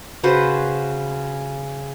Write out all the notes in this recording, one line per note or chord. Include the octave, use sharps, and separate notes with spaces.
C#3 F#4 B4 C5